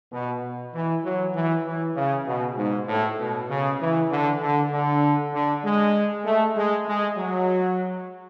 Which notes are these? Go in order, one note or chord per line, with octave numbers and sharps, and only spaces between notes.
B2
E3
F#3
E3
E3
C#3
B2
G#2
A2
B2
C#3
E3
D3
D3
D3
D3
G#3
A3
G#3
G#3
F#3